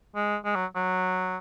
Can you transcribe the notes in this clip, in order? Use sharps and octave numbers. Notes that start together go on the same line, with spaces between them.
G#3
G#3
F#3
F#3